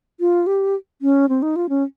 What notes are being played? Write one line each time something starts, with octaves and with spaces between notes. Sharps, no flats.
F4
G4
C#4
C4
D#4
F4
C#4